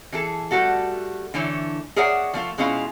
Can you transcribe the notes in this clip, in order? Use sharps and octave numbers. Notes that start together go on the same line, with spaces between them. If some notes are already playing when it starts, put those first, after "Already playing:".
E3 G#4 A4
G3 A3 F#4 A4
D3 E3 A3 E4 C#5
G#4 A#4 C#5 D5 E5 F#5
F3 A3 F4
B2 G#3 C#4 E4 F4